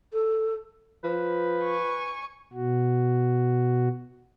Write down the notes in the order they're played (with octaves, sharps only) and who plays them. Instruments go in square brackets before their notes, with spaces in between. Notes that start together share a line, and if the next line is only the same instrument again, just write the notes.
[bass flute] A4
[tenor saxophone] F3 [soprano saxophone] B4
[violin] G#5 C#6
[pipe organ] B2 F#4